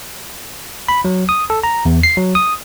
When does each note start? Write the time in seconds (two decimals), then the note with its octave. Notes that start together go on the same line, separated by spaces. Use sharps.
0.88 B5
1.05 F#3
1.29 D#6
1.50 A4
1.63 A#5
1.85 E2
2.03 C7
2.17 F#3
2.35 D#6